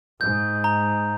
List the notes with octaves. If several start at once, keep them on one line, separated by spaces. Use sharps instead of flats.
G#2 G6
A#5